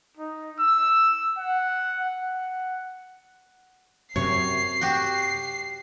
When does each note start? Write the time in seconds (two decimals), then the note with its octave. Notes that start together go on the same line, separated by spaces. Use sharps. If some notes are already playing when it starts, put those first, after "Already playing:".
0.17 D#4
0.60 E6
1.38 F#5
2.03 F#5
4.16 F#2 C3 C#5 C7
4.81 F#4 G4